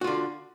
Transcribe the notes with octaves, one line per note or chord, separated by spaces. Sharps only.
D3 F4 F#4